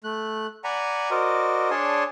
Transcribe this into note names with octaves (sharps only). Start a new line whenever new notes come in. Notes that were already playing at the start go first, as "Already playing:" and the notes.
A3 F#6
D5 F#5 G#5 A#5 B5
F#4 A#4 C5 D5 D#5
D4 G#4 C#5 D5 A5 C6